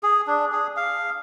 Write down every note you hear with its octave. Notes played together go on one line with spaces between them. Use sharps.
G#4
D4
G#4
F5